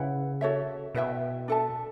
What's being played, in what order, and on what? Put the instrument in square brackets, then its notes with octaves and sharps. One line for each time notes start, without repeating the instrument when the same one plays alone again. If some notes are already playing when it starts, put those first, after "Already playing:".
Already playing: [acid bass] C#3 [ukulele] E4 B4 F#5
[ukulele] F#4 A4 C#5 E5
[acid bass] B2 [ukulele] E4 B4 E5 G5
[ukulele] D4 A4 E5 A5